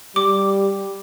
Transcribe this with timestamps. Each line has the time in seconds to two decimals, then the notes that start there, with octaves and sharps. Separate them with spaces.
0.16 G3 D6